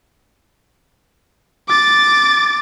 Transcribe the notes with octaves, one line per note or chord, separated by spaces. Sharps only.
D6 A6